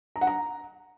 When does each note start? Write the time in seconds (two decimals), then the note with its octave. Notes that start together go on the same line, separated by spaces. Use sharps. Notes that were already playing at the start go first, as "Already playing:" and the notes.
0.16 A#5
0.21 F#5
0.27 A#5